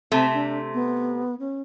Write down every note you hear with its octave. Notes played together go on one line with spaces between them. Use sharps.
C3 A3 C4
D4
B3
C#4